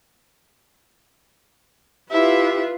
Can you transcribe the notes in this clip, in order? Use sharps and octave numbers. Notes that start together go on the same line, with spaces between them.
E4 F4 G4 B4 E5